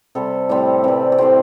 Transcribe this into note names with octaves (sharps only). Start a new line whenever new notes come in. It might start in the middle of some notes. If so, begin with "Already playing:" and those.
C3 G3 C4 A4
A2 G3 C4 D5
C3 E3 G3 D5
D5
A2 A3 C4 C5